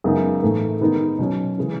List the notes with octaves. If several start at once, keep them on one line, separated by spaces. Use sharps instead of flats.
F#2 C#3 G#3 B3 D#4
A2 E3 A3 D#4
D#3 G#3 B3 D#4
B2 F#3 C#4
C#3 E3 G#3